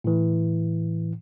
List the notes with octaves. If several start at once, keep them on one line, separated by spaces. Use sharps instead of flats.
A2 E3